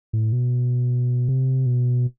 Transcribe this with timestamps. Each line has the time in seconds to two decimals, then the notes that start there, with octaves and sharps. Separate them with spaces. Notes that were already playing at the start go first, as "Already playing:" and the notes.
0.13 A2
0.32 B2
1.29 C3
1.66 B2